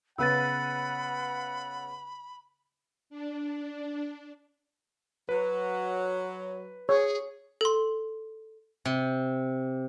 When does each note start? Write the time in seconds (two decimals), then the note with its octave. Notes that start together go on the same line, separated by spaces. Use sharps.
0.18 C#3 B3 B4 F#5 B5 E6 A6
3.10 D4
5.29 F#3 B4
6.89 G#4 C#5
7.61 A4 C6
8.85 C3